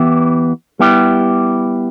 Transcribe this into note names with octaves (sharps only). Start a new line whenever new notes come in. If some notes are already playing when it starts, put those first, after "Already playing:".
Already playing: E3 B3 E4 G4
G3 B3 E4 G4